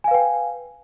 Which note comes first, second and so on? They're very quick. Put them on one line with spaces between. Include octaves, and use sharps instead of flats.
G#5 F5 B4 G5